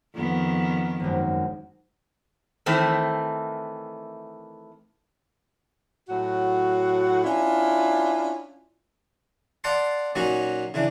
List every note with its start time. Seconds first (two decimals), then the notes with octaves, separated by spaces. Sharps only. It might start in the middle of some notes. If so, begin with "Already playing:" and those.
0.15 F2 D#3 B3
1.00 G#1 F#2
2.66 D#3 E3 A3 C4
6.09 A2 F#3 F#4
7.24 C#4 D4 E4 F4
9.64 D5 F5 F#5 A5 C6
10.15 A#2 F#3 C#4 D#4 F#4
10.74 C#3 E3 D4